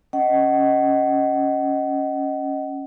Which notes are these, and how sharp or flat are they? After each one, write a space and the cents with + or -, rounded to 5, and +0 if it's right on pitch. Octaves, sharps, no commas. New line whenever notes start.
C#4 +0 D#5 +0 F#5 +30